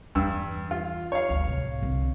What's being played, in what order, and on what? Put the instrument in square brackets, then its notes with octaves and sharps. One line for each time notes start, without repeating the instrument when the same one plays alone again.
[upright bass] E2 [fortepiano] G2 E6
[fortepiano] F4
C#5 F5
[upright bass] G1 D2
C2 A2
C2 D3